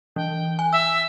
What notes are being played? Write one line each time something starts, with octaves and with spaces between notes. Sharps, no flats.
E3 G5
G#5
E5 E6